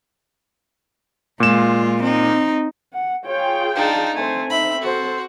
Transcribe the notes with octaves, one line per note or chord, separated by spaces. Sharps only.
A#2 G#3 F4 E7
C4 D#4
F#5
F4 G#4 C#5 G5
D4 D#4 F5 A5
A3 C4 C5 G#5
D#4 E5 B5
F#4 A4 C5